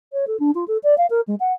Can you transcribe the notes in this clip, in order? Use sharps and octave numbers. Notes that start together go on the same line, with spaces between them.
C#5
A4
D4
F4
A4
D5
F5
A#4
G#3
F#5